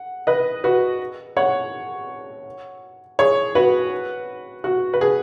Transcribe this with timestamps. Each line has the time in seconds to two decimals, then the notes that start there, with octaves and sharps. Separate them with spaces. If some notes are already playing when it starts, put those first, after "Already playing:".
Already playing: F#5
0.27 B4 D#5
0.64 F#4 B4
1.37 C#5 F#5
3.19 G#4 C#5
3.55 F#4 B4
4.64 F#4
4.94 B4
5.01 G#4